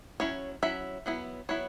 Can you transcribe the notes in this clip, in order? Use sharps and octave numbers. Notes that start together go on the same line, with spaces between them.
F#3 C#4 E4 C#5
F#3 C#4 E4 E5
F#3 B3 E4
F#3 B3 E4 C#5